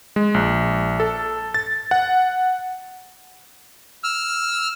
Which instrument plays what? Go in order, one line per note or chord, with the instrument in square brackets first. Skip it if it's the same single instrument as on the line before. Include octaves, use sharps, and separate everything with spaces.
[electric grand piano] G#3
A#1
A4
A6
F#5
[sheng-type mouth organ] E6 F6